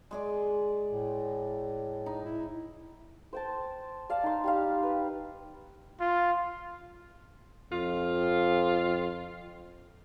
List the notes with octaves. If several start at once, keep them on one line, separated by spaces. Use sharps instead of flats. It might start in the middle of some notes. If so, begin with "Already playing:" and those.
G#3 G#4 D5
A2
D#4
E4
C5 G5 A5
D5 F5 A5
D#4 C6
G3 G4 F5
B4
F4
F2 F4